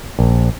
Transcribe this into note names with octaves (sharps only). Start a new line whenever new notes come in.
A#1